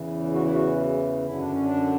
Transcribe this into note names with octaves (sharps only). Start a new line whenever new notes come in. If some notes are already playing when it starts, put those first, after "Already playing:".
Already playing: E2 C#3 E3
F#4
E4
F#4
F#2 D3 E4
D4
C#4
D4